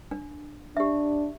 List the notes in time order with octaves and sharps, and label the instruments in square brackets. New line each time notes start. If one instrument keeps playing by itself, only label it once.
[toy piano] D4
[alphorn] D4 [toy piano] G4 E5